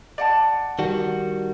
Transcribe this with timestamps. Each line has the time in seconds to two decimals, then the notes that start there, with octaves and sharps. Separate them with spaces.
0.18 D5 F#5 A5
0.79 D#3 G3 F#4